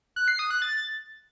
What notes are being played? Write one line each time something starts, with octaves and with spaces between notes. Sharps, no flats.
F#6
C7
D#6
F#6
A6